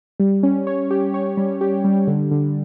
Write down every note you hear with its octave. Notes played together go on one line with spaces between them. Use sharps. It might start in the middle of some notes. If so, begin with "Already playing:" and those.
G3
C#4
C#5
G4
C#5
G3
G4
G3
D3
D3